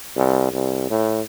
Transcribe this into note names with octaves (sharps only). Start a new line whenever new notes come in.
C2
C2
A2